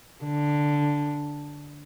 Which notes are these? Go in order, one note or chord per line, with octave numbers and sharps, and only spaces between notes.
D3